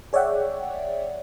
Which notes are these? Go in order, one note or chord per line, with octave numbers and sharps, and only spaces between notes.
G#4 C#5 D5 E5 F#5 G5